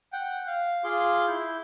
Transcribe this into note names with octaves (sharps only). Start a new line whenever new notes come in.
F#5 G5
F5
F4 G#4 C6 D6
E4 G6